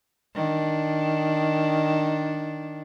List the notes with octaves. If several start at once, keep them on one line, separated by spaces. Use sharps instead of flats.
D#3 D4